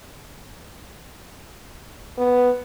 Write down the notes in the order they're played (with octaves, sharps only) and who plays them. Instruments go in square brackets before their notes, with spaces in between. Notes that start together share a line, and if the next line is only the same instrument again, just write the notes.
[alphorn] B3